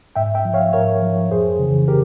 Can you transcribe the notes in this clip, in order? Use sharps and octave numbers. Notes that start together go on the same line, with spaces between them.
G#2 E5 G5
E5 G5
F3
C#5 F5
G#2 A#4 C#5
F3
F2 G#4 C5
C#3 E3
G4 A#4